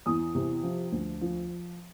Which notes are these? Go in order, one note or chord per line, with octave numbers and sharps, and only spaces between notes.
E2 D#6
C3
F3
D2
F3